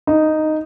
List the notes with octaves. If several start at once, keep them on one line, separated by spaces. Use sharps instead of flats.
D#4